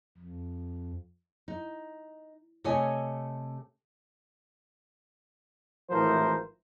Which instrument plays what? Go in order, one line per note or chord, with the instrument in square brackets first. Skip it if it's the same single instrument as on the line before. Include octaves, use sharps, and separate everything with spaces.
[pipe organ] F2
[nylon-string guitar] D#4
C3 A3 C#5 D#5 G#5
[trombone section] G#1 A2 E3 F3 A#4 C5